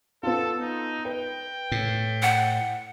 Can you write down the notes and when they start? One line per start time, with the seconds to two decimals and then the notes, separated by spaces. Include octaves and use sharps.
0.23 B3 F4 A4
0.61 D#4
1.05 B4 G5
1.72 A2
2.22 F#5